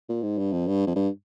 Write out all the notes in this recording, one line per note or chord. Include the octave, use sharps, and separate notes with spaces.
A#2
G#2
G2
F2
G2
F2
G2